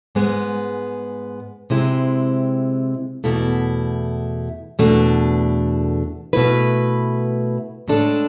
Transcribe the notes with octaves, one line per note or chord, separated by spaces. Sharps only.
G#2 G#3 B3
C3 G#3 C4 E4
E2 B2 A3 E4
E2 B2 A3 D4
B2 A3 E4 B4
A2 G#3 D4 A4